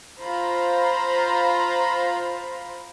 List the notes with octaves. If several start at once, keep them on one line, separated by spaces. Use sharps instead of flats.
F4 C5 A#5 B5